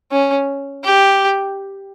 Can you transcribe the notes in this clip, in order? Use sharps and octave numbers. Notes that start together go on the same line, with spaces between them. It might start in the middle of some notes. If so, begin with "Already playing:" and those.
C#4
G4